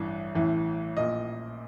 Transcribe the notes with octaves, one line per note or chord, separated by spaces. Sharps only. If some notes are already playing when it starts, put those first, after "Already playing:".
Already playing: A1 G2 E3
A1 A2 E3
A#1 A#2 D#5